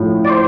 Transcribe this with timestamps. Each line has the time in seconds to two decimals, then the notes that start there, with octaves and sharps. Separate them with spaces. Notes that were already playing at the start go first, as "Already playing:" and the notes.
Already playing: A2 F3
0.25 D5
0.30 C5